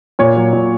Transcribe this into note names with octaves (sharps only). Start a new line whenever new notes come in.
A#2 C#5
F#3
A#2